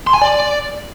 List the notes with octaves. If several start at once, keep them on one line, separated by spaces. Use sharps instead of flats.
C6
G#5
D5